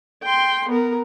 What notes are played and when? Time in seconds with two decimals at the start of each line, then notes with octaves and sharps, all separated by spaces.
0.23 G5 C6
0.69 B3 A#4